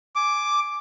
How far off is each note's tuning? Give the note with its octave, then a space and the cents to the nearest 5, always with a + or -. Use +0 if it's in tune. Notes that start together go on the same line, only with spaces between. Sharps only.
G#5 +10 D6 +0